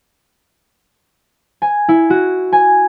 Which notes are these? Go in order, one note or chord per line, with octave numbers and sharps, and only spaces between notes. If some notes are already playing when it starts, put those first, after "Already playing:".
G#5
E4
F#4
G#5